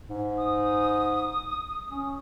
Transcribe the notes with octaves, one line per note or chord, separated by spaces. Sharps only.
G#2
D#6
C#4